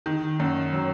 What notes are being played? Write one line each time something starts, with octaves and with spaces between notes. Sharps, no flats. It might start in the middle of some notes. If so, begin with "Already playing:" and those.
D#3
F#2
F#3